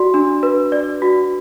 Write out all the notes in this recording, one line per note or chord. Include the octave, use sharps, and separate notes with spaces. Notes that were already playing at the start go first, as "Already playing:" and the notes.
Already playing: F#4 D5 C6
D4
B4
D5
F#4